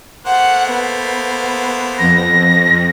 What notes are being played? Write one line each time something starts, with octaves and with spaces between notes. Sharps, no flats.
A3 A#3 C5 F#5
B3
F2 A#6